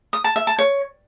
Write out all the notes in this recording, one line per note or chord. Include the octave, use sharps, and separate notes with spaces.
D#6
A5
E5
A5
C#5